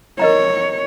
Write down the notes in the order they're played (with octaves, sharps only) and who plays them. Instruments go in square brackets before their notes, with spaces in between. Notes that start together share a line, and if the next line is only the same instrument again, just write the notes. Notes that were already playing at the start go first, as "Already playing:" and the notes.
[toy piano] A#4 D#5 A#5 [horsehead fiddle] C#5